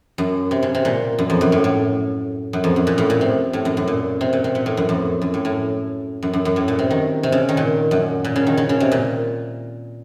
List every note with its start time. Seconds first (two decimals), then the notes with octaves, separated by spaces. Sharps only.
0.18 F#2
0.51 C3
0.63 C#3
0.75 C3
0.85 A#2
1.19 F#2
1.30 F2
1.41 F#2
1.52 A2
1.64 A2
2.53 F#2
2.64 F2
2.76 F#2
2.87 A#2
2.98 A2
3.10 A#2
3.21 C3
3.53 A2
3.65 F#2
3.77 F#2
3.88 A#2
4.21 C3
4.33 A#2
4.44 C3
4.55 A#2
4.66 A2
4.77 F#2
4.89 F2
5.22 F#2
5.34 A2
5.45 A2
6.23 F#2
6.33 F#2
6.45 F#2
6.56 A2
6.68 A#2
6.79 C3
6.91 D#3
7.23 C3
7.32 C#3
7.49 D#3
7.57 A#2
7.91 F#2
8.24 A#2
8.36 C#3
8.47 D#3
8.57 C#3
8.69 C#3
8.80 C3
8.92 A#2